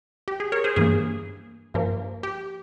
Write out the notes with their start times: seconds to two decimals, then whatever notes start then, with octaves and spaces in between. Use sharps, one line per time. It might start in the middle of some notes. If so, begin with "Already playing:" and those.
0.28 G4
0.40 G#4
0.52 A#4 C#5
0.64 G#4 C5
0.76 G2 E3 A#3 G#4
1.74 G2 F3 A#3
2.23 G4